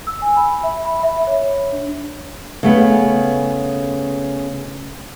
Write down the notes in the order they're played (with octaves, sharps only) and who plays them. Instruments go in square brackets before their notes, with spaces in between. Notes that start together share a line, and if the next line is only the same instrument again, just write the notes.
[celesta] E6
G#5
B5
E5
B5
E5
C#5
D4
[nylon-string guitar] C#3 A3 B3